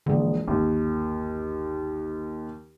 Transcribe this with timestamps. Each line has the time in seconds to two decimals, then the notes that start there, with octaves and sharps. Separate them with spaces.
0.06 E1 A#1 D3
0.48 G1 D#2